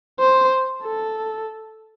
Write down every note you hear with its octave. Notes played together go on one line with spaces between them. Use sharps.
C5
A4